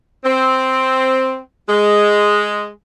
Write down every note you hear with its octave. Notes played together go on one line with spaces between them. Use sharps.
C4
G#3